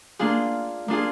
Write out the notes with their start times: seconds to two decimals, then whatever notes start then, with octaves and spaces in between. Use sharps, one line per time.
0.19 A#3 D4 F4 G#4
0.88 A#3 D4 F4 G#4